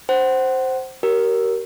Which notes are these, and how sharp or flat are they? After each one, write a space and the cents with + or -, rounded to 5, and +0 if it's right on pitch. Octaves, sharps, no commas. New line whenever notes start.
C5 +0 F#5 +30
G4 -35 A#4 +0 C#5 +0